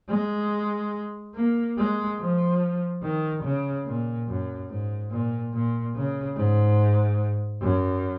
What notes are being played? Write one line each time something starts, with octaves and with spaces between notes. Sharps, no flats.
G#3
A#3
G#3
F3
D#3
C#3
A#2
F#2
G#2
A#2
A#2
C#3
G#2
F#2